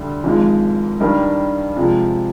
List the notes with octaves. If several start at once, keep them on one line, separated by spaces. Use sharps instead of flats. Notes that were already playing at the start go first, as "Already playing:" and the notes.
Already playing: D2 D3 G3
G#1 G#2 F3 G#3
G2 D#3 G3 D4
C3 F3 G#3